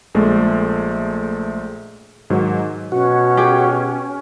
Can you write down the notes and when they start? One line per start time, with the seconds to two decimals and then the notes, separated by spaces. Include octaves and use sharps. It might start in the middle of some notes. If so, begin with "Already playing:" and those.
0.15 A#1 G#3 A3
2.30 G#2 D#3 F#3
2.92 B2 C#4 F#4
3.37 G4 G#4